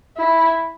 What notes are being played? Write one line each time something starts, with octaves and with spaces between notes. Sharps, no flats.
E4